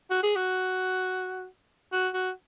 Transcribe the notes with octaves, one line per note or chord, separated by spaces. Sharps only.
F#4
G#4
F#4
F#4
F#4